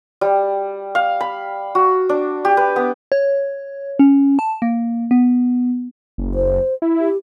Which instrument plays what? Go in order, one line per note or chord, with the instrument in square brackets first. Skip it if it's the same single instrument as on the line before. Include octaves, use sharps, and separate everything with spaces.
[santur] G3
F5
B5
F#4
D4
G4
B4
B3
[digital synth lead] C#5
C#4
A5
A#3
B3
[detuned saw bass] F#1
[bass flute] C5
[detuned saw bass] E4
[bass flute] G4